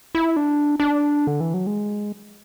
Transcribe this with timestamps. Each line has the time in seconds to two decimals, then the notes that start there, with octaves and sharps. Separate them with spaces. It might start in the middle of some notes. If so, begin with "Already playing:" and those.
0.15 E4
0.36 D4
0.80 D4
1.27 D3
1.40 E3
1.54 F#3
1.67 G#3